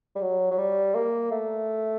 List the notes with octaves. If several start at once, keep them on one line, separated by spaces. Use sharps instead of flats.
G3
F#3
F#3
G3
A#3
A3